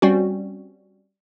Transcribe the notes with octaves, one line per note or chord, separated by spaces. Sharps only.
G3 C4 C#4 F#4